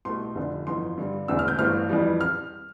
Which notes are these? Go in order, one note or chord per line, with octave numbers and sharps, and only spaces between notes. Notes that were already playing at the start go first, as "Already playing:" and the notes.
C2 B2 A3 C6
F1 F2 D3
G1 F2 E3 C6
G2 D3 G3
E1 E2 D3 A3 E6
F6
G6
G1 G2 E3 A3 C4 F6
F2 E3 G3
F6